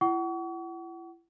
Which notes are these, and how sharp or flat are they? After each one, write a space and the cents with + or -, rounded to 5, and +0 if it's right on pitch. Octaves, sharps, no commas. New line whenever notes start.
E4 +35 F#5 +30 C#6 +40